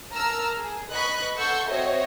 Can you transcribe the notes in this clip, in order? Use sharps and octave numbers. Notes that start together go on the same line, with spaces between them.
A#4 A5 A#5 E6 F6
G#4
B4 D#5 B5 C#6 F#6
A4 F#5 C6 C#6 E6 G6
C4 F#4 C5 C#5 D#5 E5